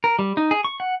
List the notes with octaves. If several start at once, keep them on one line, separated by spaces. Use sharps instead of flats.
A#4
G3
D#4
G#4
C#6
F#5